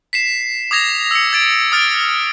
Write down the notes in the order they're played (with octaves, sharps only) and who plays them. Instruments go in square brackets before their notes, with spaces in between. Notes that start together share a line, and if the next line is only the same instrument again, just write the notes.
[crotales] B6 C7 E7
D6 D#6 G#6 A#6 F7
E6 C#7
G#6 A6 D7
D#6 F6 A6 D7